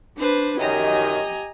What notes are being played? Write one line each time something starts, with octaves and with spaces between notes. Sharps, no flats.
D4 B4 C5
F#2 D#3 G4 D#5 G#5 A#5